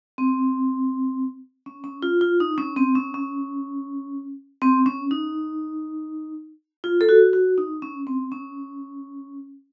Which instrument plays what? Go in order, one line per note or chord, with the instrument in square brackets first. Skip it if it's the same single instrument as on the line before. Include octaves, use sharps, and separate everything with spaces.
[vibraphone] C4
C#4
C#4
F4
F4
D#4
C#4
C4
C#4
C#4
C4
C#4
D#4
F4
A4
F#4
F#4
D#4
C#4
C4
C#4